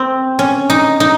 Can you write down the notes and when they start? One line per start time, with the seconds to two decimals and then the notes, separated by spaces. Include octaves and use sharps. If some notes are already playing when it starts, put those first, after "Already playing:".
Already playing: C4
0.39 C#4
0.70 D#4
1.00 D#4